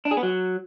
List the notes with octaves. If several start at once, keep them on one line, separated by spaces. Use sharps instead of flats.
D4
G#4
B3
F#3